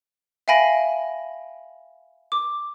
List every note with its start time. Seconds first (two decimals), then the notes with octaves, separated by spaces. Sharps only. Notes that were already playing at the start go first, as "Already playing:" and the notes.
0.48 E5 F5 G5 G#5 B5 A#6
2.32 D6